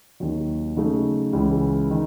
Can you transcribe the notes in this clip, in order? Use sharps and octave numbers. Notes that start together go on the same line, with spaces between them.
D#2 D#3 F#3
C#3 F#3 A3 D#4
C#2 C#3 E3
D#3